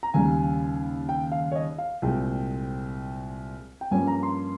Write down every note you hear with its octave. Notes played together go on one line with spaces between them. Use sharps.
A#5
D#2 C#3 G3 G#5
G5
F5
C#5
D#5
F5
C2 A#2 G#3 C4 G5
G5
G2 F3 A#3 C#4 G#5
A#5
C6